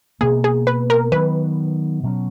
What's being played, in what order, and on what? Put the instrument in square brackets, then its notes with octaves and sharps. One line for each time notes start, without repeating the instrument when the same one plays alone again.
[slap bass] B2 A#3 C#4 [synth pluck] G#4
[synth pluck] G#4
B4
A#4
[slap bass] D#3 F#3 B3 [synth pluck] B4
[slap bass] B2 F#3 C#4